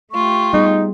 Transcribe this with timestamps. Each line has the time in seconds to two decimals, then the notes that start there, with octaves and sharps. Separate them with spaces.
0.12 A3 F4 G4 C#6
0.53 G3 B3 D#4 G#4